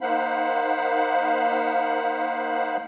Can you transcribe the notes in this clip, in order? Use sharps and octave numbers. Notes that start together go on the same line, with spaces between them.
A#3 D#4 C5 F5 F#5 B5